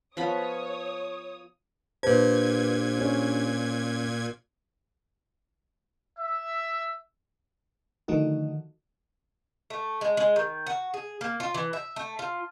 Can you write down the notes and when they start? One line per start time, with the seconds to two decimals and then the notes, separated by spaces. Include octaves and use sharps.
0.17 F3 B3 C#5 B5 D#6
2.03 A#2 D4 G4 B4 C5 G#6
2.98 C#4 C#5
6.19 E5
8.08 D3 D#3 F3 A3 D#4 F#4
9.70 A3
10.01 G#3
10.17 G#3
10.36 D#3
10.67 F#4
10.94 G#4
11.21 A#3
11.40 F4
11.54 E3
11.73 E5
11.96 A3
12.19 F4